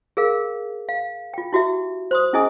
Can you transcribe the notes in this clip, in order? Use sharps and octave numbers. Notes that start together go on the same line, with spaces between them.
G#4 A#4 F5
F5
F4 G5
E4 F#4 G4 E5
C5 C6 D#6
C#4 E4 G#4 D#5 G#5 D#6